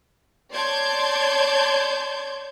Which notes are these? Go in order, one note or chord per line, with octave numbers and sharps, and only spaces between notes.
C#5 D5 A5 C6 G6 G#6